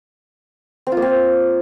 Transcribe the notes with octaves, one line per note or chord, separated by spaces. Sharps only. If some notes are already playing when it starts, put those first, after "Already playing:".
C4
F4
A#3
C4